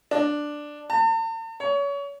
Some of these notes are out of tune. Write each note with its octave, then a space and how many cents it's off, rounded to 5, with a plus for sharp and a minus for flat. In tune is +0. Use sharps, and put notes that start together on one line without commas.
D4 +5
A5 +45
C#5 +30